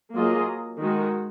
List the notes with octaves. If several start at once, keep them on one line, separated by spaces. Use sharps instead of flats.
F#3 A#3 F4 G#4 D#5
D#3 G#3 D#4 F#4